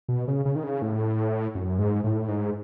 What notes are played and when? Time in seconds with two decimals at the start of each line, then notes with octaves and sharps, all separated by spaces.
0.09 B2
0.28 C#3
0.45 C#3
0.56 D#3
0.64 C#3
0.82 A2
1.55 F#2
1.79 G#2
2.04 A2
2.28 G#2